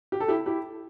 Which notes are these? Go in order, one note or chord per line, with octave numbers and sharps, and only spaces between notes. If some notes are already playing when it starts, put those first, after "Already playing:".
G4
A4
E4 G4
E4 G4